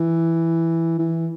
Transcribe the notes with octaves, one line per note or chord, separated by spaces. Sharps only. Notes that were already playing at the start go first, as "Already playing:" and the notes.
Already playing: E3
E3